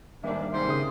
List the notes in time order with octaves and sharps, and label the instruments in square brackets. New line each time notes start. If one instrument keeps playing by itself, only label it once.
[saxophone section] G#2 D4 [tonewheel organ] D#3 G3 A#3 [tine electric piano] E5
[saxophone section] G#2 C3 [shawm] C5
[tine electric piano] C#3 D#6